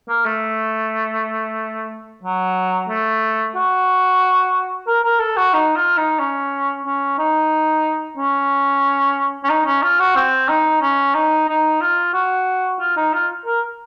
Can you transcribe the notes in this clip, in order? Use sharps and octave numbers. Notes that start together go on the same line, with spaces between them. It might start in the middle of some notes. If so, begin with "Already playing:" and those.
A#3
A3
F#3
A3
F#4
A#4
A#4
A4
F#4
D#4
F4
D#4
C#4
C#4
D#4
C#4
C#4
D#4
C#4
F4
F#4
C4
D#4
C#4
D#4
D#4
F4
F#4
F4
D#4
F4
A#4